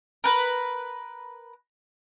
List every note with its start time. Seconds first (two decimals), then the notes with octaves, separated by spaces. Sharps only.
0.24 A#4 B4